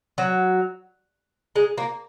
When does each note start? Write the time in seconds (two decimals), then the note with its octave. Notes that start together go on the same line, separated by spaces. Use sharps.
0.18 F#3
1.56 G#3
1.78 A#3